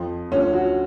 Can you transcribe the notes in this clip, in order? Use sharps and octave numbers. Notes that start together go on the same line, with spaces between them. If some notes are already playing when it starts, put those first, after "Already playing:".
Already playing: F2 F3
D2 D3 F3 C#4
F#4